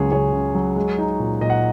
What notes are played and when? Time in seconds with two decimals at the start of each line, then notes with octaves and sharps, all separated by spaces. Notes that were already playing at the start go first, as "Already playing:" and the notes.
Already playing: C#2 C#3 F#3 G#4 C#5
0.12 C#2 G#4 C#5
0.33 C#3
0.55 F#3
0.76 G#3
0.98 D#4
1.19 A#2
1.41 A#2 D#5
1.50 F#5